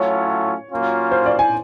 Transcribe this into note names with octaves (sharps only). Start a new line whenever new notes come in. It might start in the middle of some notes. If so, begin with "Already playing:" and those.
Already playing: A2 F#3 A3 C#4 F4 C#5
A#2 F#3 A#3 C#4 F4
C5
D5
G#5